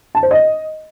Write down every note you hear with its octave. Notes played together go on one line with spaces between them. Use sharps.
A5
C5
D#5